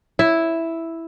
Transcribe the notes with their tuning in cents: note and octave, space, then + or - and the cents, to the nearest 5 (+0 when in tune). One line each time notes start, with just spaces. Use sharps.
E4 +0 E5 +0